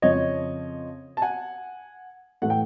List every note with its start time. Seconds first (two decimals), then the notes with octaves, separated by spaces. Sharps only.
0.02 F2 C#3 F3 C#5 D#5
1.17 A5
1.22 F#5 G#5
2.42 A2 E3 A3 F#5
2.50 G5